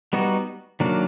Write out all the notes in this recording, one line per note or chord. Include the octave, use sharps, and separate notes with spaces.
G3 B3 D#4 F#4
D#3 F#3 A#3 D4